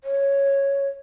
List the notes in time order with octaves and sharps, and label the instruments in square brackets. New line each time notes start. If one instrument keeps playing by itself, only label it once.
[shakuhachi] C#5